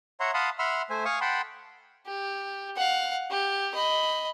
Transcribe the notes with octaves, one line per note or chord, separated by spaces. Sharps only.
C#5 E5 F#5 A#5 C6
F5 F#5 A5 B5 C6 D#6
E5 F#5 B5 C6 E6 F6
A3 C5 E5 G#5
F5 G#5 C#6 D#6
F#5 G5 A5 B5 C6
G4
F5 F#5
G4
D#5 B5